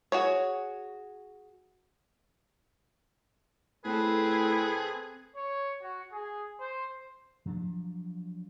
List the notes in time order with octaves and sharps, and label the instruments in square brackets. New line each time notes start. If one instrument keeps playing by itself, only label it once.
[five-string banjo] F#4 G#4 C#5
[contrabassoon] A2 [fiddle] C4 A4 [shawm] G#4 [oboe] B4
[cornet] C#5
F#4
G#4
C5
[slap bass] F3 F#3 C4 D4